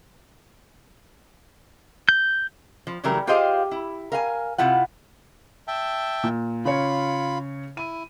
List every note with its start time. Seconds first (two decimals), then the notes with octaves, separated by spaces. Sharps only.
2.09 G6
2.87 F3
3.04 C#3 E3 F#3 G3 A3 A#4
3.27 F4 G4 G#4 C5 D#5 F5
3.71 E4
4.12 A#4 F5 G#5
4.58 C3 E4 F4 F#5
5.67 E5 G5 A5
6.24 A#2
6.65 C#3 F4 C#5 B5
7.77 E4 D#7